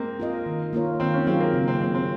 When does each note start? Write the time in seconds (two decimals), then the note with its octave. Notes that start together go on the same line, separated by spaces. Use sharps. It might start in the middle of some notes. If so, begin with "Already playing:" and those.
Already playing: G#3 A#3 C4
0.20 F4 A#4 D#5
0.46 D#3
0.73 A#3 F4 A#4 C#5
1.00 D#3 C4
1.14 C#4
1.27 F#3 C4 C#4 F4 G#4
1.40 A#3
1.54 C#3
1.68 C4
1.81 F#3 A#3 C4
1.95 C4